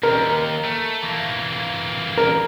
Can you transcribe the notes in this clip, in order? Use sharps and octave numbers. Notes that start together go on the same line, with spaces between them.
D#2 A#4
A3
E3 A#3
A#4